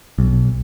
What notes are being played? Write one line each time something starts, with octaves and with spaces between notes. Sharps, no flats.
B1